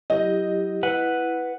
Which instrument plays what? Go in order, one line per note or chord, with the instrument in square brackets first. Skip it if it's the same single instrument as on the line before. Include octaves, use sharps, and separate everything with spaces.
[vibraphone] F#3 E4 G4 [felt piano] D#5
[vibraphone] E4 [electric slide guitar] B4 F#5